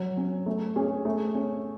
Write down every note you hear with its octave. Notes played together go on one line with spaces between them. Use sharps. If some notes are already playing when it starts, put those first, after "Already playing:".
Already playing: F#3
C#4
A3
C#4 G#4
A3
C#4